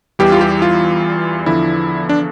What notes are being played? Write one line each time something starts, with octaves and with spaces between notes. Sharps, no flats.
E2 E3 G3 G4
F4
G4
F4
E2 D3 F3 E4
D4